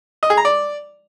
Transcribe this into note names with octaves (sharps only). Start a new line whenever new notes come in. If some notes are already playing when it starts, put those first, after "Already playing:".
D#5
G#4
A#5
D5